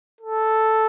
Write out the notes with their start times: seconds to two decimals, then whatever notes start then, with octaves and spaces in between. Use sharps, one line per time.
0.21 A4